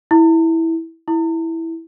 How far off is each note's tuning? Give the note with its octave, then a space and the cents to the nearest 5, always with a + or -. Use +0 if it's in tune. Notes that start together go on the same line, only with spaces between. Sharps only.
E4 -10
E4 -5